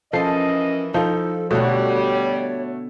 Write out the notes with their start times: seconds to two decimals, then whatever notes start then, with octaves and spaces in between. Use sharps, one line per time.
0.13 E3 F3 C#4 A4 A#4 D#5 C7
0.94 F3 D#4 A4
1.51 B2 D3 G3 A3 F#4 C#5